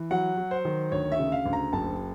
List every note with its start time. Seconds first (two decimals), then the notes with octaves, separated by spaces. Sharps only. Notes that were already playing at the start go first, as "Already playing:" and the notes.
Already playing: E3
0.11 F#3 F#5
0.37 F#3
0.51 C5
0.65 D#3
0.92 D2 C#5
1.12 E5
1.19 C#3
1.32 F5
1.46 D2
1.53 A#5
1.73 F#1 A5